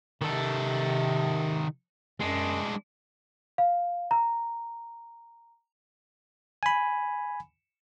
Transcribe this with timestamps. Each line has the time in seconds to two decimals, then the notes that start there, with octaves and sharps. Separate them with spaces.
0.22 C3 D#3 A4
2.20 F#2 G#3 D4
3.58 F5
4.11 A#5
6.63 G#5 B5